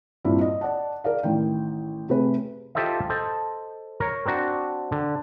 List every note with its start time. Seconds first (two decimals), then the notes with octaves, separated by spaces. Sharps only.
0.25 G2 A#2 C4 E4
0.41 D#5
0.61 D5 F#5 A5
1.04 A#4 D5 F5
1.23 A1 D#3 E3 G5
2.09 C3 A3 G#4 B4
2.75 F4 G4 A4 C5 D#5 E5
3.10 A4 C5 D#5
4.00 A#4 C#5
4.26 C4 D4 F#4
4.92 D3